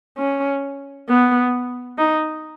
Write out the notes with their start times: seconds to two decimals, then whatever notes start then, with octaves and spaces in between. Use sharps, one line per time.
0.18 C#4
1.09 B3
1.98 D#4